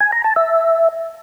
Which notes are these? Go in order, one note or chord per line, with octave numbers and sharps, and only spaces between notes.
G#5
A#5
A5
E5